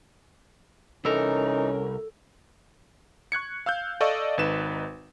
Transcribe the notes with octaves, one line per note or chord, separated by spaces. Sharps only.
C2 E3 C#4 D#4 A4 A#4
C#6 F#6 G#6 C#7
F5 E6 F#6 G6
A4 D5 D#5 F5 C#6 E6
G#1 D#4 B4 E7